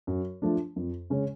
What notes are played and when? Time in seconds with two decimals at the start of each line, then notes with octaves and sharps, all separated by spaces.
0.07 F#2
0.42 F3 A3 D4
0.76 F2
1.10 C#3 G#3 C#4